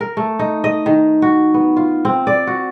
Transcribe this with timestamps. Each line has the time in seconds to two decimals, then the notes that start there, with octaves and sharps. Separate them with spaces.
0.01 A#4
0.17 A3
0.39 D#4
0.64 D#5
0.86 D#3
1.22 F#4
1.54 B3
1.77 F4
2.05 C4
2.27 D5
2.47 F#4